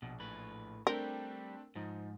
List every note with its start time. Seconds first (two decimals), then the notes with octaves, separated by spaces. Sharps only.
0.02 A#1 B2
0.20 A2 B4
0.87 G3 A3 C4 D4 A#4 G5
1.75 G#2 F3 D#4